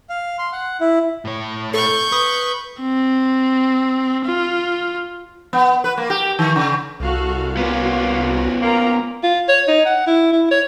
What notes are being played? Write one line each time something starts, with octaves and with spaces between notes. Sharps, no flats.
F5
C6
F#5
E4
A2 C#5
A4 C#6 G6
B4 D#6
C4
F4
B3
B4
A#3
G4
D#3
C#3
C2 F#4 A4 F5
A#3 B3 C#4 F4 F#4
A#3 F4 A#4 A#5
F4
C#5
D#4
F#5
E4
E4
C#5